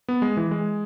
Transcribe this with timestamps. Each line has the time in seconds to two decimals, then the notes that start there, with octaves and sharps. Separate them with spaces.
0.08 B3
0.22 G#3
0.37 E3
0.51 G#3